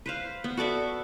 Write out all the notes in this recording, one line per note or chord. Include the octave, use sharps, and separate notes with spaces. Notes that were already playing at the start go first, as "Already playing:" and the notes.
B4 C5 F5
B3
F#4 A4 D5 E5